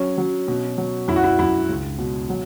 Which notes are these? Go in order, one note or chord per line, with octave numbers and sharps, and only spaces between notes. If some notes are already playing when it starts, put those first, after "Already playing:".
Already playing: F#3 C#4
F#3
B2
F#3
F#2 E4
F#4
E4
F#2 E4
C#2
B2
F#3